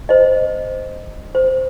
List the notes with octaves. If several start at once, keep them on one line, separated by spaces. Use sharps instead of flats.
C5 D#5
C5